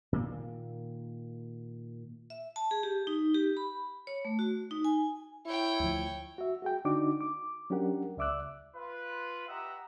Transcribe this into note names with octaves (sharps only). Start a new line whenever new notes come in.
A#2 D#3 A#3
E5
A5
G#4
G4
D#4
G4
B5
C#5
A3
F#4
D#4
G#5
E4 C#5 G5
D2 F3
F#4 E5
F#4 G#4 G5
D3 D4 D#4 F#4 D6
D6
F#3 C#4 D4 G4 A#4 F#5
C#2 D5 E5 D6 E6 F#6
F4 B4
G4 D#5 E5 F#5 A#5